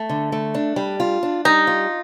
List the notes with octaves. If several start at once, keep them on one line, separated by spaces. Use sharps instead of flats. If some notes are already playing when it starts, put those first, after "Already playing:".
Already playing: A3
D3
A3
D4
G3
F4
D4
G3 D#4
F4